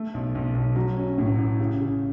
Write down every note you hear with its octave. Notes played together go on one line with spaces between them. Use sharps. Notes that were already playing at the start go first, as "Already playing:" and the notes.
Already playing: A3
B1
B1
B1
F#3
C#4
A2
A1
C#3
C#3